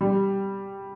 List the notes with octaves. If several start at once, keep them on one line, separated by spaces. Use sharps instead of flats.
G3